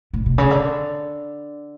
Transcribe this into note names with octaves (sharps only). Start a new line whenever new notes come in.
A2
B2
C#3
D3